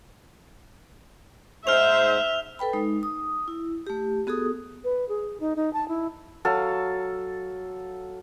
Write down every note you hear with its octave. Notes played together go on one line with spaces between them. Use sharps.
G#2 C5 E5 F6 F7
A4 B4 G5 B5
G#3 D#4
D#6
E4
A3 G4
B3 F#4 G#4 A4 D#6
B4
G#4
D#4
D#4
A5
E4
F#3 A4 F5